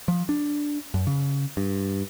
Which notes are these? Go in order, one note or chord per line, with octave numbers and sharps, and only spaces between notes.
F3
D4
F#2
C#3
G2